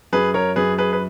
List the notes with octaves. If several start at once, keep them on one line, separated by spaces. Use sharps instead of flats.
F#2 G#4 B4
A#4 C#5
F#2 G#4 B4
G#4 B4
B4